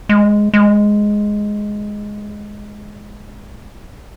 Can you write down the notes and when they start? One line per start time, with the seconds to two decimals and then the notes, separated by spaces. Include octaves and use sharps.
0.09 G#3
0.54 G#3